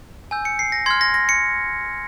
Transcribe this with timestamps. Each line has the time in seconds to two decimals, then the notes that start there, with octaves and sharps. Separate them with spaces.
0.31 G#5 E6 G6
0.45 C#7
0.59 C7
0.72 A#6
0.86 C6 F6 G#6
1.01 A#6
1.14 A#6
1.29 C#7